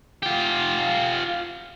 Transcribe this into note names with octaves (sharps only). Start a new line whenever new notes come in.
F4 G4